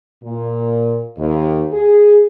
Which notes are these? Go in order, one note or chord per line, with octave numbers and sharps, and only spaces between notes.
A#2
D#2
G#4